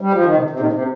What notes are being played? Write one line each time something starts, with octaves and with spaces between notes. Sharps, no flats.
G3
F3
D#3
C3
C3
A#2 D#3
C3